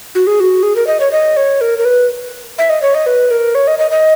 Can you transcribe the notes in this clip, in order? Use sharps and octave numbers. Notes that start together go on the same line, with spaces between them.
F#4
G#4
F#4
G#4
A#4
D#5
C#5
D#5
C#5
A#4
A#4
B4
E5
D#5
C#5
D#5
B4
A#4
C#5
D#5
D#5
D#5